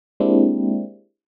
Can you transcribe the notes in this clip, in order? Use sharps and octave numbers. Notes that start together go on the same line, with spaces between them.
G#3 A#3 C4 D4 E4 G4